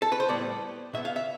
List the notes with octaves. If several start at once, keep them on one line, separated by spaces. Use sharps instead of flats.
A4
B4
C5
A2 G3 B3 D5
B2 B3 E5
F5
E5